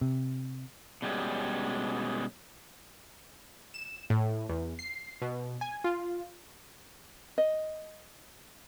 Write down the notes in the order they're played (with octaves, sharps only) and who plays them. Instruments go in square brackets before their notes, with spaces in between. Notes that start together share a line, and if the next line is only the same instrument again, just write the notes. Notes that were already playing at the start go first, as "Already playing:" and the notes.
[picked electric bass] C3
[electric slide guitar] B2 G3 G#3 C#4
[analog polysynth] E7
A2
E2
C7
B2
G#5
F4
[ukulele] D#5